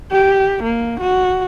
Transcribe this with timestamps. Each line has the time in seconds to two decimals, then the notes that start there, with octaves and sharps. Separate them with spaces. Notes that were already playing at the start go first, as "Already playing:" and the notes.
0.11 G4
0.63 A#3
1.00 F#4